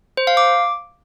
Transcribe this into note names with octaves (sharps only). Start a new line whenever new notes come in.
C5
F5
D6